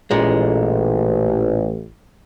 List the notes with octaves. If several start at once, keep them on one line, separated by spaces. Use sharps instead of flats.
A1 A#2 G#3